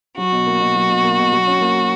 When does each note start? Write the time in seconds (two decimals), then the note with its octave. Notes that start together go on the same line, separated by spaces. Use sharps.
0.18 F#3 F#4
0.32 B2
0.46 A#3
0.60 B2
0.75 F#3
0.89 B2
1.03 A#3
1.18 B2
1.32 F#3
1.47 C#4
1.61 A#3